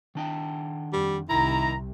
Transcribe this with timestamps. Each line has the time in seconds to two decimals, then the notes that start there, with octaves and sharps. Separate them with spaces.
0.15 D#3 D4 G5
0.93 F2 G3
1.30 C2 C3 D#3 E4 A#5